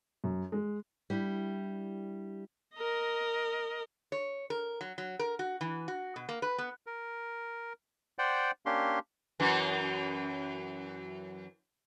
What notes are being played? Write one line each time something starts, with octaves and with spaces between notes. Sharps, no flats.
F#2
G#3
G3 D4 E4 G4
A#4 D#5
C#5
A#4
F#3
F#3
A#4
F#4
E3
F#4
B2
A#3
B4
B3
A#4
C5 D5 F#5 G5
A#3 C#4 D4 G4 C6
F#2 E3